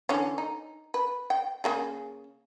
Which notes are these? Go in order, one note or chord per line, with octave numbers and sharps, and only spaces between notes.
D3 E3 C#4
D#4
B4
G5
C#3 A#3 G#4